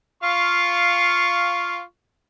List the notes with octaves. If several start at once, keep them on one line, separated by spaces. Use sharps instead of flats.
F4 F5 C#6